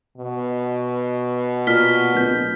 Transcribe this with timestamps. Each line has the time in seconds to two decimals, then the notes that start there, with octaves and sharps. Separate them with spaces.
0.18 B2
1.67 A#2 F6 B6 G7
2.14 D1 G6 B6